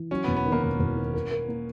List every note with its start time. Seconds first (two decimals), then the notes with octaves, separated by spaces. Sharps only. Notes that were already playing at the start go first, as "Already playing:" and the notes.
Already playing: E3
0.11 F#3 C#4
0.24 E1 B3
0.37 B3
0.46 D#3
0.52 A#3
0.63 E1 B3
0.79 E1
0.97 D#3
1.14 A#4
1.31 A#4
1.48 A#3